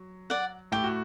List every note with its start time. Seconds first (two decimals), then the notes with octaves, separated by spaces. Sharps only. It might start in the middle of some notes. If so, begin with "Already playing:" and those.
Already playing: F#3
0.30 D5 F#5
0.72 A2 A3 G4
0.84 F#4